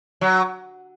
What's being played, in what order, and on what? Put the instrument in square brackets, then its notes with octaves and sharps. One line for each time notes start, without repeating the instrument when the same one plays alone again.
[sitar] F#3